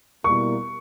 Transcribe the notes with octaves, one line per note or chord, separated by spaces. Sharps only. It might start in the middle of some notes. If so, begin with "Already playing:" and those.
B2 G3 A#3 E4 A#4 C#6